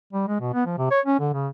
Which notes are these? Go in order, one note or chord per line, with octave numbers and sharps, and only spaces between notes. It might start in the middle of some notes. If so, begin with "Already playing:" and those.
G3
G#3
B2
B3
F3
C3
C#5
C#4
D3
C#3